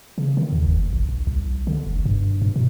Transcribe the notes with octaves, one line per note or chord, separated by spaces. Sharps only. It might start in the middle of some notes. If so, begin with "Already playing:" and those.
C#3
D#3
D#2
F#1
A#1
A#1
C2
D3
F#1
G2
G2
B2